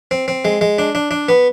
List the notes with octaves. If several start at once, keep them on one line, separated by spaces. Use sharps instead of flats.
C4
C4
G#3
G#3
D4
D4
D4
B3